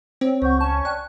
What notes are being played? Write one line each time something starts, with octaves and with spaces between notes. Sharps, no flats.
C4 C5 C#5
C#2 C5 F#5 C#6 G6
C#4 A5 C#6
D5 G5 A5 F#6